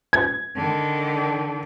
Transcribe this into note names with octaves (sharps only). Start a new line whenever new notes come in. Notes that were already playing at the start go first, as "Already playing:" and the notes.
G#6
D3 D#3